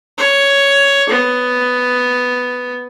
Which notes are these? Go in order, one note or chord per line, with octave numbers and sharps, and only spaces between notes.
C#5
B3